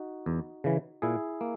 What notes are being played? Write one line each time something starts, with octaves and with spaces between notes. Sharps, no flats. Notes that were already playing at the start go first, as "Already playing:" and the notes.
Already playing: D#4 F#4
E2
C#3 E3
A#2 E4 G#4
A#3